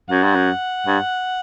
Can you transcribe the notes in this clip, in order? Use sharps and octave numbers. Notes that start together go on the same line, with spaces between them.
F#2 F#5
G2
F#2
G2